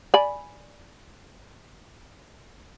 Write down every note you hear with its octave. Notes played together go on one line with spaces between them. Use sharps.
D5 G#5 B5